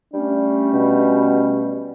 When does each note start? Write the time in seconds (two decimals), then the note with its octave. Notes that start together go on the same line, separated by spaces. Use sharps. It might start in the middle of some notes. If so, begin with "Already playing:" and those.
0.13 G3 A3 C#4 D4
0.73 B2